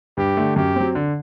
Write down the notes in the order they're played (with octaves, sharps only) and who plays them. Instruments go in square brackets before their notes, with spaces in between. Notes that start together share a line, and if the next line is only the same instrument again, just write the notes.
[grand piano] G2 [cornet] G4
[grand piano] D3 A3
[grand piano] F#2 [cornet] G4
[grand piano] F#3 C4
D3